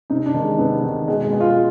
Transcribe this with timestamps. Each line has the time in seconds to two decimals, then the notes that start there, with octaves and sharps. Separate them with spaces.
0.10 C3 D#4
0.26 D4
0.34 D#3
0.42 G#3
0.59 C3 B3
0.83 D#3
1.08 B2 G#3
1.24 G#3
1.33 B2
1.41 F4